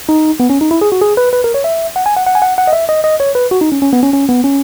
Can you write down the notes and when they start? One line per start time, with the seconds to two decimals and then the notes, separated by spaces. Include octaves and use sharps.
0.09 D#4
0.40 B3
0.50 C#4
0.61 D#4
0.71 E4
0.81 G#4
0.92 F#4
1.01 G#4
1.17 B4
1.33 B4
1.44 A#4
1.54 C#5
1.64 E5
1.96 F#5
2.06 G#5
2.16 F#5
2.27 F#5
2.35 G#5
2.42 F#5
2.58 F#5
2.67 D#5
2.73 E5
2.89 D#5
3.04 D#5
3.20 C#5
3.35 B4
3.51 F#4
3.61 D#4
3.72 C#4
3.82 C#4
3.93 B3
4.03 C#4
4.13 C#4
4.29 B3
4.44 C#4